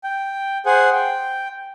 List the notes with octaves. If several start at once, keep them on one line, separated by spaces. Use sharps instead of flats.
G5
G#4 C5 F#5 G#5
G5